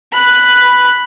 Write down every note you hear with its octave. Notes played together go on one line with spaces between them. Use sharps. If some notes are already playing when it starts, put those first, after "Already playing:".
B5 F#6